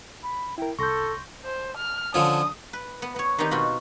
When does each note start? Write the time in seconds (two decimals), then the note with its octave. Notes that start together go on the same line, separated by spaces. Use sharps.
0.23 B5
0.58 E4 A#4 G5
0.79 C2 A4 C6 C#6 G6 A#6
1.45 C5
1.78 F6
2.14 D3 F3 C#4 D#6
2.73 B4
3.02 B3
3.16 B3 C#5
3.38 D#3 B3 C4 D#4 G4
3.51 B2 F4 F#4 B5